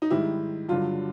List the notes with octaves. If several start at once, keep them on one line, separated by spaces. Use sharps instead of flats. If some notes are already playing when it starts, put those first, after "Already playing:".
D#4
G#2 D#3 G3 E4
G2 D3 F#3 F4